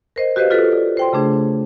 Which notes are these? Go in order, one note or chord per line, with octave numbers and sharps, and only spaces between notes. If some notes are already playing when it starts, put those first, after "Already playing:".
A#4 C5 D#5
F#4 G4 B4 C5 D#5 F5
F4 F#4 A4 B4
D5
C5 G5 C6
C#3 A3 D4 G#4